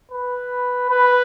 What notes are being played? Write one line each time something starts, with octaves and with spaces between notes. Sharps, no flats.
B4
B4